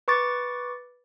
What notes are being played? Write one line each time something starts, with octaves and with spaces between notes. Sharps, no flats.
B4 C#6 D6 A6